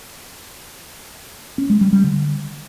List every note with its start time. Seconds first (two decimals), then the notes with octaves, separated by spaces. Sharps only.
1.58 C#4
1.70 G#3
1.81 G3
1.93 G3
2.04 D3